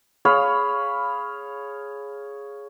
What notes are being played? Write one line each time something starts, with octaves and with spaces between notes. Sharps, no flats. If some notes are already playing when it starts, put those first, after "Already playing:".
G#4 C#5 F5 B5